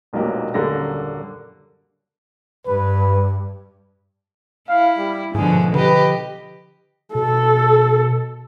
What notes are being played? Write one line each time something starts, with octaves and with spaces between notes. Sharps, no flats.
E1 B1 A#2 F#3 A#3 G4
D#1 F#2 D3 G3 A#3 A#6
G2 B4
E4 F5
G3
G#2 B2 D3 F3 G#4
D3 F3 G4 B4 D#5
B2 A4